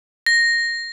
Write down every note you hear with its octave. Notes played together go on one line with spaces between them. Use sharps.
A#6